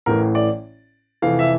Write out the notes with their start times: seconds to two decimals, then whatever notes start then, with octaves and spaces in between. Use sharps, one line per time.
0.06 A1 A2 E3 A#4
0.35 D5
1.22 F1 F2 E3 F5
1.39 E5